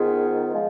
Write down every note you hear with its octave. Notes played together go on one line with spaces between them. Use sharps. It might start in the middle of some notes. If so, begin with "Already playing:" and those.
Already playing: G#2 D#3 B3 F4 G#4
F3 G#3